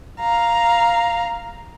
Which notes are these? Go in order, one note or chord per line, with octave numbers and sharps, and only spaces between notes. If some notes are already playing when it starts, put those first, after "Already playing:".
F5 A#5